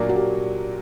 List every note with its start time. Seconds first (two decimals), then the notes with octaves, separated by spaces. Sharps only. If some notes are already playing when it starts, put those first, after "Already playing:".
Already playing: A#2 F#3 A#3 D4
0.09 F#4
0.16 G4